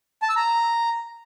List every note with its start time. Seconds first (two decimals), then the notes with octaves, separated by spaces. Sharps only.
0.22 A5
0.29 E6
0.36 A#5